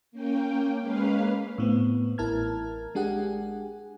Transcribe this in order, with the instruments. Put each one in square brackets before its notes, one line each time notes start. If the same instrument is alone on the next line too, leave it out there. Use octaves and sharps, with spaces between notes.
[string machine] A#3 C#4 G5
G#3 A#3 C#4 B4 F5
[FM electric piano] A2 B3 C4
A1 E4 A#4 A5 F6 G#6
G#3 D4 G4 G#4 F#5 G#5